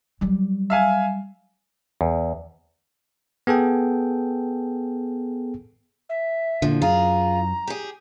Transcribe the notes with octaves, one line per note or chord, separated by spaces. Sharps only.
F#3 G3
E5 F5 G#5
E2
B3 G#4 A4 G5
E5
A#2 D3 F3
F#2 F4 G#4 A#5
G4 G#4